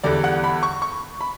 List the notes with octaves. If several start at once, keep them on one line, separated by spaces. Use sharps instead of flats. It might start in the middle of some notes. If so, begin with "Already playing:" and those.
E2 D3 G3 D5
F#5
B5
C#6
C#6
B5